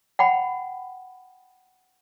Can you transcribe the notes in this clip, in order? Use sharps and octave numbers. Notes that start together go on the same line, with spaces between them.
F#5 G5 B5